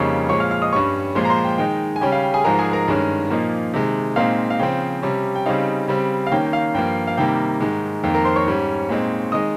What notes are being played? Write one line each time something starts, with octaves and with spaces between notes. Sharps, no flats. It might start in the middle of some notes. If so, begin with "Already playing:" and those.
Already playing: F2 C#3 G3 A#3 D#4 C#5 C#6
A#2 F3 G#3 C#5 C#6
F5 F6
F5 F6
D#5 D#6
G2 G3 C#4 C#5 C#6
A#2 F3 G#3 C5 C6
A#5
C5 C6
G5
D#3 G#3 D#4 G5
G#5
C#3 G3 C#4 G5
F5
G5
G#4 G#5
G#2 F3 G#3 A#4 A#5
G#4 G#5
A#4 A#5
G2 D#3 G#3 C#4
A#2 F3 A#3 D#4
C3 D#3 G#3
A#2 G#3 C4 D#4 F5
F5
C#3 F3 C4 G5
C3 G3 C#4
G5
C#3 G3 C4 D#4 F5
C#3 G3 C4
F5
D#3 A#3 C#4 G5
G5
F5
G2 F3 A#3 G5
F5
C3 D#3 G3 A#3 G5
G#2 D#3 G#3
F2 D#3 A#3 G5
A#4 A#5
C5 C6
C#5 C#6
G#2 G3 C#4
A#2 G#3 C4 D#4
D#3 G#3 D#5 D#6